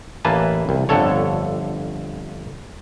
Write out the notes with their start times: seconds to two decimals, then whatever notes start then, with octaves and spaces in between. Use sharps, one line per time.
0.25 A1 E3 A#3 B4 G#5 A5
0.69 C2
0.89 G1 F2 D3 A4 C#5